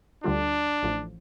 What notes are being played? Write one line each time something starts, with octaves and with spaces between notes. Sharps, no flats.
D2 D3 G3 D4 F4
A1 A2 F3